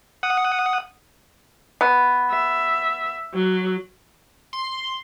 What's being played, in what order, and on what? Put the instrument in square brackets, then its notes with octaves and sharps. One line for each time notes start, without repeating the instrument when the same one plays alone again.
[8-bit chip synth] F#5 D#6
[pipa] B3
[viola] E5
F#3
[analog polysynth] C6